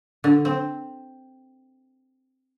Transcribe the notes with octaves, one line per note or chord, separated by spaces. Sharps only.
D3
C4